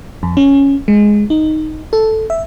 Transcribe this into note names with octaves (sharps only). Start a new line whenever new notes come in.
F2
C#4
G#3
D#4
A4
E5